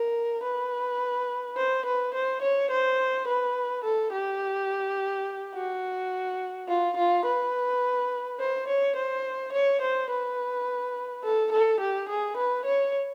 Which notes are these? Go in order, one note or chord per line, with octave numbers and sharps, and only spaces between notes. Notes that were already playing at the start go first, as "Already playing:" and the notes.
Already playing: A#4
B4
C5
B4
C5
C#5
C5
B4
A4
G4
F#4
F4
F4
B4
C5
C#5
C5
C#5
C5
B4
A4
A4
G4
G#4
B4
C#5